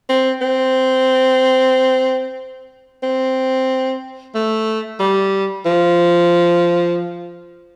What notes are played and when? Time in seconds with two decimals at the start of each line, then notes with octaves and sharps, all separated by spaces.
0.09 C4
0.41 C4
3.03 C4
4.35 A3
5.00 G3
5.65 F3